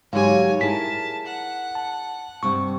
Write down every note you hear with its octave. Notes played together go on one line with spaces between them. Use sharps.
G#2 D3 F#3 G4 C#5 F5 G#5
E4 G#4 A#4 A5 B6
F#5
A5
G2 C3 C#6